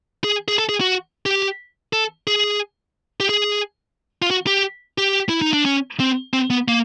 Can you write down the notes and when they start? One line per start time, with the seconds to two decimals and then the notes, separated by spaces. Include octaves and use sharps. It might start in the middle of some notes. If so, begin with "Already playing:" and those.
0.24 G#4
0.48 G#4
0.58 A4
0.69 G#4
0.81 F#4
1.26 G4
1.93 A4
2.27 G#4
3.20 G4
3.29 G#4
4.22 F4
4.31 F#4
4.47 G4
4.98 G4
5.29 E4
5.42 D#4
5.53 D4
5.66 C#4
6.00 C4
6.33 C4
6.50 B3
6.68 A#3